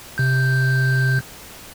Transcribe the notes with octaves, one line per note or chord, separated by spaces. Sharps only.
C3 G6